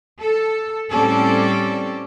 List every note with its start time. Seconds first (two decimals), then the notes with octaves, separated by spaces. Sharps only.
0.21 A4
0.91 A2 G3 C4 C#4 A4 D5